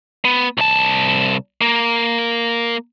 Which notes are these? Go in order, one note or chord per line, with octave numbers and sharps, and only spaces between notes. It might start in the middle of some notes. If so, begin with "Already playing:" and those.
B3
C2 A5
A#3